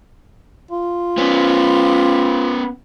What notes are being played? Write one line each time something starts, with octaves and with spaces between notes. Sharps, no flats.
F4
B3 C#4